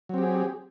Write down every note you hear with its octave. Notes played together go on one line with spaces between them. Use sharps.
F#3 C4 G4 G#4